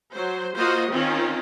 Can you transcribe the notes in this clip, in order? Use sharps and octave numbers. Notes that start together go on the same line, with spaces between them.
F#3 C5
A#3 F4 F#4 C5 D#5
D#3 C4 C#4 F4